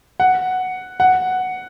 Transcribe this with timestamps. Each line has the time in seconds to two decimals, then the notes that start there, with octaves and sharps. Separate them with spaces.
0.20 F#5
1.00 F#5